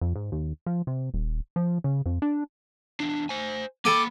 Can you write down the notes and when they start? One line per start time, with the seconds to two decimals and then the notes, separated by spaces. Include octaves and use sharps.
0.01 F2
0.16 G#2
0.32 D#2
0.66 F3
0.87 C3
1.14 D#1
1.56 F3
1.84 C#3
2.06 F2
2.22 D4
3.00 E2 D4
3.29 C5 G#5
3.85 A#3 A4 G5 G#5 B5 D6